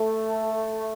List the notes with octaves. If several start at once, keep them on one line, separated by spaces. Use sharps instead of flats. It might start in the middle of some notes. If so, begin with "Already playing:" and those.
Already playing: A3 A4